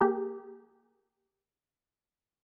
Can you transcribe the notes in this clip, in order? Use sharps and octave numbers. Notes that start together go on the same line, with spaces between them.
A#3 G4 G#4 A#4